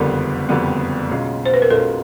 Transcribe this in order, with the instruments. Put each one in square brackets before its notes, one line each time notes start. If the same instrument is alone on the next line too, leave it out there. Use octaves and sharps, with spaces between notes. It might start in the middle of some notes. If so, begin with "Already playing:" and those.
Already playing: [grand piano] F#1 F2 D3 G3 B3 [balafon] A#4
[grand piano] F#1 F2 D3 G3 B3
B1 B2 G#3 C#4 F4
[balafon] C5
B4
A#4
[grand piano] B1 B2 G#3 C#4 F4 [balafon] A4